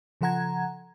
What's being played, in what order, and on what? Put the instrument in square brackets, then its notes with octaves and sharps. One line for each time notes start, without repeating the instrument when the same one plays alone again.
[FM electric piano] C#3 F3 A4 F#5 A#5 G#6